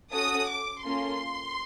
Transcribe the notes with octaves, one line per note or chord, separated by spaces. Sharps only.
C#4 F#4 A4 D#6
D6
A#3 C#4 F4 A4 C6